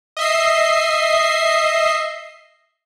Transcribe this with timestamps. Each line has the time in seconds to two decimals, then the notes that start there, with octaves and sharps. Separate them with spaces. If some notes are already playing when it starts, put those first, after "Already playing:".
0.17 D#5 E5 C7